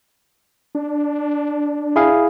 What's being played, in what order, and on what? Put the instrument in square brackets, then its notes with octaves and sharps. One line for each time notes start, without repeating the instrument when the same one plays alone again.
[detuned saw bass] D4
[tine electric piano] E4 G#4 F5